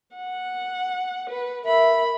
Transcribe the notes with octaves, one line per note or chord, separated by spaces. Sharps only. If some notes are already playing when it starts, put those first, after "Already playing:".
F#5
B4
A#4 E5 B5